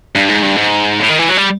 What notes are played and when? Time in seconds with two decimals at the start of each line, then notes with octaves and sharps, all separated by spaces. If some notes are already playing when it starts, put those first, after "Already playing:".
0.15 G2
0.29 G#2
0.43 G2
0.57 G#2
1.00 A2
1.09 D#3
1.19 E3
1.29 F#3
1.37 G3